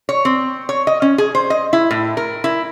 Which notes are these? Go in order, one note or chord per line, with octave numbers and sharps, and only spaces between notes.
C#5
C4
C#5
D#5
C#4
G#4
C5
D#5
E4
A2
A#4
E4